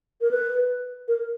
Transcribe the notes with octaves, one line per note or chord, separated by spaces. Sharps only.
A#4
B4
A#4